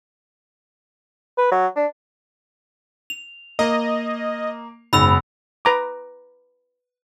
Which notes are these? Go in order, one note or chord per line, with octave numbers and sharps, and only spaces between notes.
B4
F#3
D4
F7
A#3 D#5
F#1 G#2 B3 B5 E6 F7
B4 A#5 D6